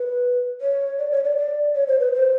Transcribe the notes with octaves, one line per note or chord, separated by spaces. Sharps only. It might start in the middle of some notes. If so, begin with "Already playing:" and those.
Already playing: B4
C#5
D5
C#5
D5
D5
C#5
C5
B4
C5